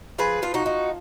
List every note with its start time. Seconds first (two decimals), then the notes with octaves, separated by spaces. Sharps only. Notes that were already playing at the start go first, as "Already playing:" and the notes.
0.18 F3 G#4 B4
0.42 F3 F4
0.54 D#4 F#4
0.66 D#4